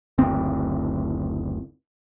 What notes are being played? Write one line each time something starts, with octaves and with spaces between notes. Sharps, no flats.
F#1 D2 C4